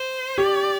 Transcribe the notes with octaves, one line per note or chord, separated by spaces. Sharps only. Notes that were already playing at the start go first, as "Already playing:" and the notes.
Already playing: C5
G4 D5